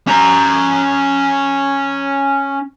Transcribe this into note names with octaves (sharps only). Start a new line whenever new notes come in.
C#4 A#5